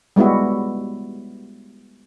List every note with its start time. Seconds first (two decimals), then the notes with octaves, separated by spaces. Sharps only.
0.16 G3 G#3 B3 E4 F#4